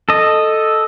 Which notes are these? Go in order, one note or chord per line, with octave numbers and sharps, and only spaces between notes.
A4 D#5